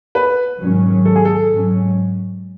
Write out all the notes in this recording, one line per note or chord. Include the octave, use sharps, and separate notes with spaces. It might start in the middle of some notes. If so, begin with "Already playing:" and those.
B4
G#2 D#3 F#3 C#4
A4
G#4
A4
G#2 F#3 C#4